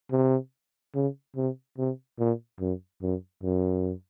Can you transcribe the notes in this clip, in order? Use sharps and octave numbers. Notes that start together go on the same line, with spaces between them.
C3
C#3
C3
C3
A#2
F#2
F#2
F#2